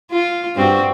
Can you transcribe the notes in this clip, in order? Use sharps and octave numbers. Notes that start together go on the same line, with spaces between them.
F4
G2 C4 F#4